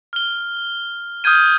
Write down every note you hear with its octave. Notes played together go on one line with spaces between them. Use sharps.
F6 G7
D#6 F6 G6 G#6 D#7